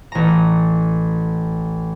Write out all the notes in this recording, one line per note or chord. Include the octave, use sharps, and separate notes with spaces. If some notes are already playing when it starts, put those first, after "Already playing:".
A1 A#5